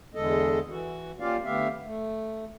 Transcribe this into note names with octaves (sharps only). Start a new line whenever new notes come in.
E2 D3 G#3 A4 D#5
E3 F#4
A#3 C#4 F4 G4 D5 F5
D3 A3 B3 G4 E5 F5
A3